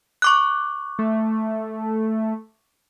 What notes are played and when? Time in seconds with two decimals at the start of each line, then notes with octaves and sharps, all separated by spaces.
0.22 C#6 D6 F#6
0.99 A3